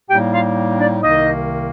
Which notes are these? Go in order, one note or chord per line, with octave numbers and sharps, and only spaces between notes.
A2 G3 A#3 D#4 G4 G5
F4 F5
D4 D5
C2 C3 D#3 A#3 D#4 D#5